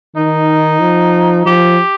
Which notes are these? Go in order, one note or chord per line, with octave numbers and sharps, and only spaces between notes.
D#3 D#4
F3
F3 G4